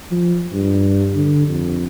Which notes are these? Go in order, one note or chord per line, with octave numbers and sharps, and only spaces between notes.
F3
G2
D3
F2